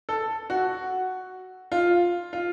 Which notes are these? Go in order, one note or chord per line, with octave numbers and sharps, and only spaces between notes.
A4
F#4
F4
F4